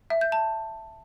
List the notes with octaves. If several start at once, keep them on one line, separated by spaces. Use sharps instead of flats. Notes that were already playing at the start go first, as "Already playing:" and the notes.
E5
G6
A5